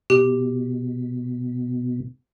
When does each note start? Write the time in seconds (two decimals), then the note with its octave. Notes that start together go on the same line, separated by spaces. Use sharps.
0.10 B2 G4